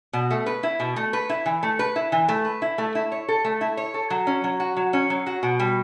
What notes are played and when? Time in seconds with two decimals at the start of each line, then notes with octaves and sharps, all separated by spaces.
0.13 B2
0.31 A3
0.46 B4
0.63 E4
0.80 B2
0.96 A3
1.13 B4
1.29 E4
1.46 E3
1.63 A3
1.79 B4
1.96 E4
2.12 E3
2.29 A3
2.45 B4
2.62 E4
2.78 A3
2.95 E4
3.12 C#5
3.28 A4
3.45 A3
3.61 E4
3.77 C#5
3.94 A4
4.10 F#3
4.27 C#4
4.44 F#3
4.60 F#4
4.77 F#3
4.93 C#4
5.10 F#3
5.26 F#4
5.43 B2
5.60 G3